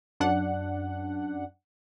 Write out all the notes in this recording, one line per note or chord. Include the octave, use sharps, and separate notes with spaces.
F#2 D4 F#5